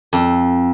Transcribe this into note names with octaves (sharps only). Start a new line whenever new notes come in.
F2